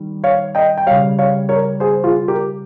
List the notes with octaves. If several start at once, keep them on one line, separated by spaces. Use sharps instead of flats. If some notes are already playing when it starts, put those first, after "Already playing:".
Already playing: D#3 G3
C#5 F5
D#5 G5
G5
C#3 G3 C#5 F5
C#5 F5
A#4 C#5
G#4 C5
F4 G#4
G4 A#4